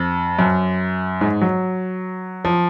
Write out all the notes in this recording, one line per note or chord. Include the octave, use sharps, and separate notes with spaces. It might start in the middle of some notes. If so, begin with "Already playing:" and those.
Already playing: F2
F#2
G#2
F#3
F3